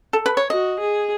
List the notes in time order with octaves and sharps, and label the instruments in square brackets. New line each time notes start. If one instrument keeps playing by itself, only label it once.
[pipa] A4
B4
C#5
[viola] F#4 [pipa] D#5
[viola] G#4